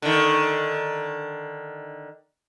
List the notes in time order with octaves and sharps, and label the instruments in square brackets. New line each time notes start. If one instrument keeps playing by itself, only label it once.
[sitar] D3 D#3